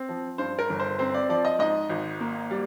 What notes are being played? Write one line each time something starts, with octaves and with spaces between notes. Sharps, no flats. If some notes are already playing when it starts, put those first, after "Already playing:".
Already playing: C4
F3
G2 C5
A#4
G1
C5
C4 C5
D5
F3 D5
D#5
G#2 D#5
G#1
A#3
G3